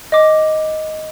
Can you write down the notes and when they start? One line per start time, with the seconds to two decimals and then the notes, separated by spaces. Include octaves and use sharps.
0.12 D#5 D6